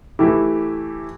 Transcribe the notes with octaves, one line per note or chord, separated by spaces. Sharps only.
E3 A3 E4 G4